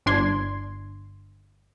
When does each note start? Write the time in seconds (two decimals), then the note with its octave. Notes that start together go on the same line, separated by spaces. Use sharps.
0.06 G1 D4 C6 G#6